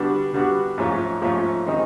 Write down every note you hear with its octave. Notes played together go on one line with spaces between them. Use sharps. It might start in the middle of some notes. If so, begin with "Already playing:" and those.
Already playing: D3 G3 B3 D4 F#4
D3 G3 B3 D4 F#4
G#2 F3 A3 C#4 F4
G#2 F3 A3 C#4 F4
D#3 G#3 C4 D#4